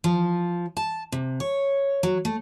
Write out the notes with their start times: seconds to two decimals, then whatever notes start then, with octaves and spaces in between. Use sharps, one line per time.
0.04 F3
0.77 A5
1.12 C3
1.40 C#5
2.03 F#3
2.25 A3